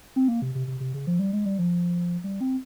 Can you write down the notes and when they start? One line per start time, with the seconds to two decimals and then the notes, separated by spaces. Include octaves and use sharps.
0.16 C4
0.28 A#3
0.42 C3
0.55 C3
0.67 C3
0.80 C3
0.94 C#3
1.07 F3
1.19 G3
1.33 G#3
1.45 G3
1.58 F3
2.24 G3
2.40 C4